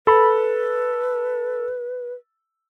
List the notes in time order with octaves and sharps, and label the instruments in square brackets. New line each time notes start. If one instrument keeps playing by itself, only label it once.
[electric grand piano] A4 [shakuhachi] B4 [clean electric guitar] B5